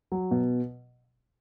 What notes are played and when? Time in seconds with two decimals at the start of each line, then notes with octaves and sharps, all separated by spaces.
0.12 F#3
0.31 B2